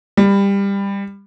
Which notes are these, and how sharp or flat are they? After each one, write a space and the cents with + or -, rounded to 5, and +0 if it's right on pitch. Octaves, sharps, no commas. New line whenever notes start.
G3 +20